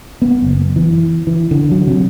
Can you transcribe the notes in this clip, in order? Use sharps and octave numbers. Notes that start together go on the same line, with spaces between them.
B3
F#1
E3
E3
D3
F#3
C3